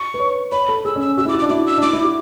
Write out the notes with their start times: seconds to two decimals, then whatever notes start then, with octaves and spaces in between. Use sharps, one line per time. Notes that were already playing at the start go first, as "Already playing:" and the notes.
Already playing: C#6
0.14 B4
0.20 C#5
0.52 C#5 B5
0.68 A4
0.85 G#4 E6
0.96 C#4
1.00 E6
1.17 F#4 E6
1.25 E4
1.29 D6
1.33 F#4
1.39 D6
1.42 D4
1.49 E4 D6
1.67 E6
1.78 D4
1.82 E4 D6
1.93 E4
2.04 F#4